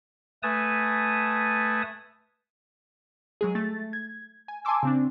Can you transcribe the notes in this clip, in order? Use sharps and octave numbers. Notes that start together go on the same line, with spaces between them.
A3 B4 G#5 A5 D#6
F#3 G#3 G#4
A3 A6
G#6
G#5
G#5 A5 C6 D6 E6
C#3 C4 D4